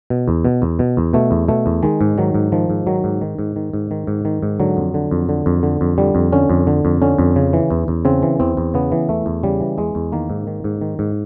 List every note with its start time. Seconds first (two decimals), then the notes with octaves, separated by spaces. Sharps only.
0.10 B2
0.28 E2
0.45 B2
0.62 E2
0.79 B2
0.97 E2
1.13 B2 A3
1.31 E2
1.48 B2 A3
1.66 E2
1.83 D#3 G#3
2.01 G#2
2.18 D#3 F#3
2.35 G#2
2.52 D#3 F3
2.70 G#2
2.87 D#3 F#3
3.04 G#2
3.21 D#3
3.39 G#2
3.56 D#3
3.73 G#2
3.91 D#3
4.07 G#2
4.25 D#3
4.43 G#2
4.60 D3 F#3
4.77 F2
4.94 D3
5.11 F2
5.29 D3
5.46 F2
5.63 D3
5.81 F2
5.98 D3 G3
6.15 F2
6.33 D3 C#4
6.50 F2
6.67 D3
6.85 F2
7.02 D3 C#4
7.19 F2
7.36 C#3
7.53 E3
7.71 E2
7.88 E2
8.05 C#3 C4
8.22 E3
8.40 E2 C4
8.57 E2
8.74 C#3 B3
8.92 E3
9.09 E2 A3
9.26 E2
9.43 C#3 G3
9.61 E3
9.78 E2 G#3
9.95 E2
10.12 D#3 A#3
10.30 G#2
10.47 D#3
10.64 G#2
10.81 D#3
10.99 G#2